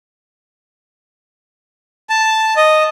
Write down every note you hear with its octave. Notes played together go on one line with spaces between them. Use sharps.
A5
D#5